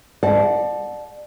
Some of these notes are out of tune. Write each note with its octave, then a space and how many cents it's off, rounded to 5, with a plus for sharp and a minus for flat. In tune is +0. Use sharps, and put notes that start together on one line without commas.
D5 +30 F#5 -35 A5 -25